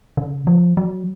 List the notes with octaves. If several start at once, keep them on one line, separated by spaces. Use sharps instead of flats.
C#3
F3
F#3